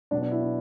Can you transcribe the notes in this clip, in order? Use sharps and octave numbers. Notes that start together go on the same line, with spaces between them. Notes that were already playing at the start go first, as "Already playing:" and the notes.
B2 F#3 D4
D4
E4
E4